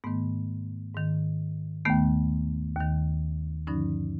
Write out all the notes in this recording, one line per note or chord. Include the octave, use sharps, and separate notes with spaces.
G#2 D#3 A3 B3
G#2 D#3
D#2 D#3 A3 B3
D#2 D#3
G2 D3 F3 C#4 D#4